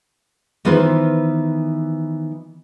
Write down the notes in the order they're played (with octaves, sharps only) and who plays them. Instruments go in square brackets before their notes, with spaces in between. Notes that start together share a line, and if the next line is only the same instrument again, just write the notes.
[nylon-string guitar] D#3 E3 B3 F4 B4 C5